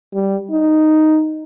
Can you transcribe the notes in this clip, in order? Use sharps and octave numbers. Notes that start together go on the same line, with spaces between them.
G3
D#4